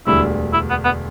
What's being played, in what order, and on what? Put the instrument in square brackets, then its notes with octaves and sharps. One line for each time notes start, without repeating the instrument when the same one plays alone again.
[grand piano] E1 D2 D3 G3 [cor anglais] E4
[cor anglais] E4
B3
B3